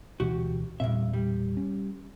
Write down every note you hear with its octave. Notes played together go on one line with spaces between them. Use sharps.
D2 B2 E3 F#4 G4
E1 G2 A#2 C4 E5
G3
C#4